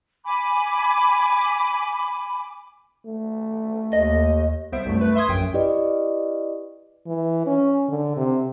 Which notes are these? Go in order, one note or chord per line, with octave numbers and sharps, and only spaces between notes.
G#5 B5 D6
A3
D#2 D#5
C2 B3 C5 E5 D7
C2 F#2 A3
A3 B4
E5 C6 D#6 G#6
A#1 F#2 G5
E4 G4 B4 D5 D#5
E3
C#4
D3
C3